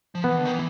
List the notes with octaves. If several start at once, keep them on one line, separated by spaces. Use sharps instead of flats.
F3
E3 B3
D3
D#3
E3